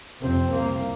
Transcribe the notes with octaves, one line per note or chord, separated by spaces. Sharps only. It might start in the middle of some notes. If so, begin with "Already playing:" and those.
F2 C3 C4
C2 C3 A#3